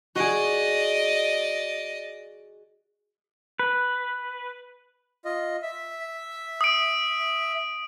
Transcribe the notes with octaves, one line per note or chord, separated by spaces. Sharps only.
F#4 G#4 D5 D#5
B4
F4 D#5
E5
D#6 D7